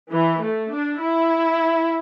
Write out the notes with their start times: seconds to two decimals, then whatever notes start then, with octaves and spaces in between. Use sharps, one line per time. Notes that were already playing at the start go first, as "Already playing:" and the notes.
0.12 E3
0.41 A3
0.70 D4
0.99 E4